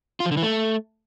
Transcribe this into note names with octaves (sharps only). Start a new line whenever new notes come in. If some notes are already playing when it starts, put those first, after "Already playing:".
F4
F3
D3
E3
A3